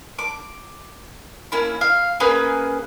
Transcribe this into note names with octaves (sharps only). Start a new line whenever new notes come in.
D6
A#3 C#4 E4
F5
A#3 C#4 G#4 B4